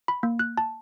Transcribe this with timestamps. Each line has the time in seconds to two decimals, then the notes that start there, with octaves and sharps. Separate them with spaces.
0.08 B5
0.23 A#3
0.39 F#6
0.57 A5